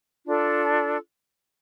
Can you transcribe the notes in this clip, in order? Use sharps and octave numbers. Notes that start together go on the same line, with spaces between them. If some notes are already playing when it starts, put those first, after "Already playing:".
D4 F4 A4